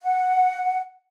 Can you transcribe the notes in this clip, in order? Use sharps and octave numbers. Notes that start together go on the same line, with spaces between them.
F#5